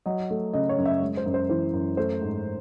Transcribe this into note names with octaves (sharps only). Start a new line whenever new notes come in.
F#3 D#5
A3
C#3 D#5
C#5
F#2
E5
G#3
C5
F#2
C5
E3 C5
F#2
A3 C5
G#2